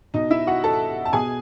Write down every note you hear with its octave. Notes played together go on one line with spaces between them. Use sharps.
B2 D#4 D#5
E4 E5
F#4 F#5
A4 A5
A5
B2 G#4 G#5